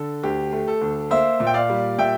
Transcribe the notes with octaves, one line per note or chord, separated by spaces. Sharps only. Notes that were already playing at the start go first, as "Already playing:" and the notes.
Already playing: D3 A4
D2 G4
A3
A4
D2
A#3 C5 E5
A#2
G5
D5 F5
G3
A#2 E5 G5